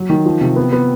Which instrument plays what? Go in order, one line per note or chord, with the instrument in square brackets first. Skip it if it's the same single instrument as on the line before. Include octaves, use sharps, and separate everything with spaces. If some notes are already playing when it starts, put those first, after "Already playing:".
Already playing: [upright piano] F#3
D#3
F3
C3
B3
B3